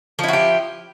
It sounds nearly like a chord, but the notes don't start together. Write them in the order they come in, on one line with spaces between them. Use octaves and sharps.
F3 E4 F#4 G4